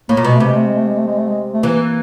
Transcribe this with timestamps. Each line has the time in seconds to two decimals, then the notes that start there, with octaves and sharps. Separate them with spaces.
0.09 A2 A#3
0.17 A#2
0.24 B2 G#3
0.35 A3
0.40 C3
0.46 G#3
0.55 A3
0.66 G#3
0.76 A3
0.87 G#3
0.97 A3
1.07 G#3
1.17 A3
1.28 G#3
1.54 A3
1.63 E3 A#3